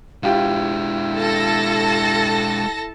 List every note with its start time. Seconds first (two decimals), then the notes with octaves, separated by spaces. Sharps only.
0.23 G#3 D4 E4 F4 G4
1.15 A4 A5 A#6